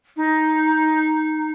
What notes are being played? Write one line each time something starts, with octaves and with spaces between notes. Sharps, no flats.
D#4